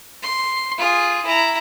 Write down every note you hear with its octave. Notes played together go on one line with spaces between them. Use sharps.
C6
F4 G#4
E4 A#5